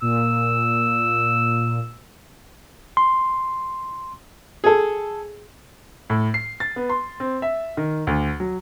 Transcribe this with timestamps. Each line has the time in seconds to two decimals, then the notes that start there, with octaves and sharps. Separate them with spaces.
0.02 A#2 E6
2.97 C6
4.64 G#4 A4
6.10 A2
6.34 C7
6.60 A6
6.76 B3
6.89 C6
7.20 C4
7.42 E5
7.77 D#3
8.07 D2
8.40 F#3